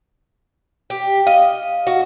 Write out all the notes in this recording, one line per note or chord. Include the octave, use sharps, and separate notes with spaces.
G4
D#5 F5
F#4